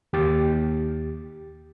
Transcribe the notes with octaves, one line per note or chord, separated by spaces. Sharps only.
D#2 G4 A6